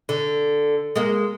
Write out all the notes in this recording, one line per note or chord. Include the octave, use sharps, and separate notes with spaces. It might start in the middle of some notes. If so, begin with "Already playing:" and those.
D3
G#3 A#3